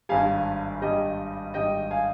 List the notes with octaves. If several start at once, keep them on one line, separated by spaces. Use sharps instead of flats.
G#1 G2 G3 F5 G#5
G#1 G2 G3 D#5 G5
G#1 G2 G3 D#5 G5
F5 G#5